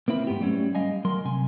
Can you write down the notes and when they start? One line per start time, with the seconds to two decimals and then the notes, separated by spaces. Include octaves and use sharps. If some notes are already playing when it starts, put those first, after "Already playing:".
0.08 A#3 C4 E4 B4
0.27 G#2 B3 G4
0.41 F#3 G3 A3 C#4
0.75 G3 D#5 F5 G#5
1.05 F#3 A#4 C6
1.25 C3 G#5